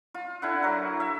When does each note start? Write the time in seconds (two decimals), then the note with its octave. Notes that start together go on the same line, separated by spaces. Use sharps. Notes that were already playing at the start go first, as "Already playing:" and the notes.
0.14 F4
0.42 D3 E4 F#5
0.63 F#3 A#4
1.00 E5